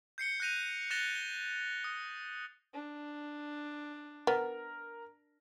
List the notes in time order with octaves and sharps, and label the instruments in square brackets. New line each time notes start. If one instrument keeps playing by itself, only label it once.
[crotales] G6 C7 C#7 G7
F#6 G6 A#6 D#7 F7
F#6 A6 A#6 E7 F7 G7
G7
D#6
[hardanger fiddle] D4
[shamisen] B3 [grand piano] A#4